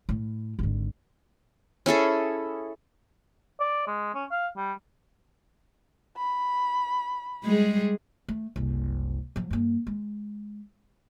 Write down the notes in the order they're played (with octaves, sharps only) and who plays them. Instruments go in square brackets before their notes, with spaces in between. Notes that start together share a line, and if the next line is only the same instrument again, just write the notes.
[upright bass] A2
G#1 D3
[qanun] C#4 E4 G#4 A4
[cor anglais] D5
G#3
C#4
F5
G3
[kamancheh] B5
[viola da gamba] G3 G#3 G#4
[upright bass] A3
F#1 C2
F3 F#3
G2 A#3
G#3